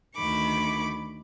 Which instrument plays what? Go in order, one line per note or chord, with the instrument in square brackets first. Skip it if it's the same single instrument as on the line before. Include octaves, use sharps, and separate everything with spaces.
[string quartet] D2 D#3 B5 C#6 D6